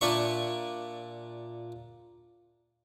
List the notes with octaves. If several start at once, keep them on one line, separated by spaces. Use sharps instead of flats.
A#2 D4 E5 C#6